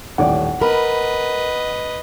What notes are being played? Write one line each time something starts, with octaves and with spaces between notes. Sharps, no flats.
D#1 A1 D5 F#5
A#4 B4 D#5 B5